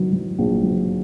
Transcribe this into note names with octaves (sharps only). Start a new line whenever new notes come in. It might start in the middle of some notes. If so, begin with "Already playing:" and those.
Already playing: D#3 F#3
F#3
A#1
F#3